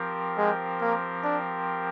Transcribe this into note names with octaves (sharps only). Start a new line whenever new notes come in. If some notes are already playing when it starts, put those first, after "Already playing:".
Already playing: F3 C4 G4 A#4
G#3
A#3
D4